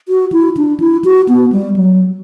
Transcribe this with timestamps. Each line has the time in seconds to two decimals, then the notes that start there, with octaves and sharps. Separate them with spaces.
0.09 F#4
0.32 E4
0.57 D4
0.80 E4
1.05 F#4
1.29 B3
1.52 G3
1.76 F#3